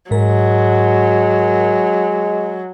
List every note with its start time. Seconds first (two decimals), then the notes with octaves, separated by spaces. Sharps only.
0.11 G#2 F#3 G#3 A#4